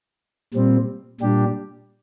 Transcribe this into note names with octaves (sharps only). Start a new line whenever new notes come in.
A#2 G3 C4
A#2 G3 D4 G4